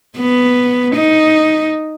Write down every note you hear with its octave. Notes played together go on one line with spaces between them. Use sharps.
B3
D#4